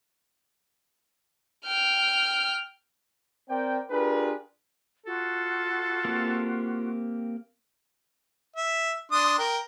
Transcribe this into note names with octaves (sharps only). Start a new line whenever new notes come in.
G5 F6
C4 A#4 C5 D5 G5
D4 F4 G4 G#4 A#4 B4
F4 F#4 A4
A#3 C4 G4
E5
D4 C6 D#6
A#4 G5